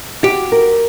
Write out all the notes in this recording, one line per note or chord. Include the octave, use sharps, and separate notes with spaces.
F#4 G4
A#4